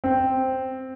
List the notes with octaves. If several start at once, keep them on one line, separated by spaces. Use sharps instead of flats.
C4